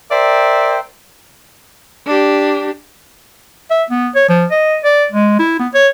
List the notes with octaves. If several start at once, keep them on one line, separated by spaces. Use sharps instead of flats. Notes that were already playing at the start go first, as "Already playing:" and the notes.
A#4 C5 D5 E5 G5
D4 G4
E5
B3
C#5
F3
D#5
D5
G#3
E4
B3
C#5